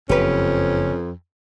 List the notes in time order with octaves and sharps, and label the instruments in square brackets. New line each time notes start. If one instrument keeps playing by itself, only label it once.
[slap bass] F#1 [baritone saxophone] F2 [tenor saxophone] C#4 [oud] G4 B4